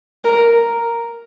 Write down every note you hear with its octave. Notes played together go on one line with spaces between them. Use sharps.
A#4